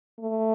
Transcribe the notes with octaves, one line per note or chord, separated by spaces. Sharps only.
A3